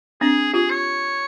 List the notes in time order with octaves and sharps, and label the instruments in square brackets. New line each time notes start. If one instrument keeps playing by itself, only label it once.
[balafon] C4 D4 [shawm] G#4
[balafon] F4 G4 [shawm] G#4
[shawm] C#5